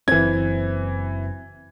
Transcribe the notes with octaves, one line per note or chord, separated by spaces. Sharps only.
F#1 E3 C4 G#6